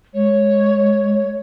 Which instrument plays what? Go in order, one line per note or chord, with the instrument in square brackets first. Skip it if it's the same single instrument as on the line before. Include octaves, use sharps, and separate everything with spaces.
[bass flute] G#3 [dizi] C#5